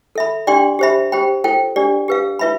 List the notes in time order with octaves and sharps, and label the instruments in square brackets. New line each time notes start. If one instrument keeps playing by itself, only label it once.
[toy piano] A4 E5 B5
D4 G4 D5 G5 C6
G4 C5 E5 B5
G4 C5 G5 B5
F4 A4 C5 G5
D4 G4 D5
G4 B4 F5
F4 B4 E5 B5